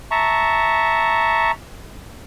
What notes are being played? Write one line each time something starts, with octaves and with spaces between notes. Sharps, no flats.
E5 A5 A#5 C#6